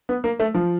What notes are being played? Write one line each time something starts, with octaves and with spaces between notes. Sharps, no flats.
B3
A#3
A3
F3